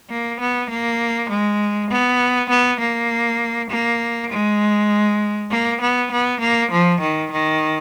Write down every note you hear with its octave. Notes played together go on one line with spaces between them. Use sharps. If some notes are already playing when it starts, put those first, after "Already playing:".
A#3
B3
A#3
G#3
B3
B3
A#3
A#3
G#3
A#3
B3
B3
A#3
F3
D#3
D#3